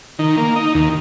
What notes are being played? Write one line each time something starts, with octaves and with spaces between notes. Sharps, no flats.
D#3
A#3
D#4
D#2